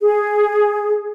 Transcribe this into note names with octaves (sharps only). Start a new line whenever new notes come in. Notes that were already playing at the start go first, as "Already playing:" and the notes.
G#4